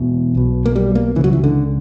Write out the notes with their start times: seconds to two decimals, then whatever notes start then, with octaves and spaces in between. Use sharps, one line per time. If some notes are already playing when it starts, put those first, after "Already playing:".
Already playing: E1 E2 B2
0.35 B1 B2
0.66 A#3
0.76 G3
0.95 A#3
1.16 C#3 E3
1.19 C#2
1.24 F#3
1.33 E3
1.44 D3